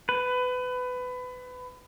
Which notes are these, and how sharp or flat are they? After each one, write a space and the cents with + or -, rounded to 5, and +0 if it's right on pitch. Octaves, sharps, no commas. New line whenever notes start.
B4 +25